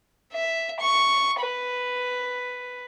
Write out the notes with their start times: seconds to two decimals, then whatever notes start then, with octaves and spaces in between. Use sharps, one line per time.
0.33 E5
0.80 C#6
1.40 B4